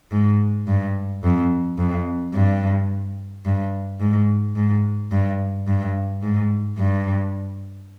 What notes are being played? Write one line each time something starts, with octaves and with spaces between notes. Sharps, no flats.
G#2
G2
F2
F2
G2
G2
G#2
G#2
G2
G2
G#2
G2